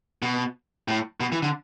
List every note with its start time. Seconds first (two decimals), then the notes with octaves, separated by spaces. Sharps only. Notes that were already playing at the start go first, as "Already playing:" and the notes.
0.22 B2
0.88 A2
1.20 B2
1.32 E3
1.43 D3